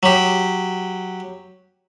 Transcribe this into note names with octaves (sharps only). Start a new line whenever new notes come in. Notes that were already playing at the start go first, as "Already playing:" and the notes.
F#3 G4